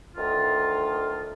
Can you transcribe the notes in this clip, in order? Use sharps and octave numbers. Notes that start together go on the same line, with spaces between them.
D2 D#3 F4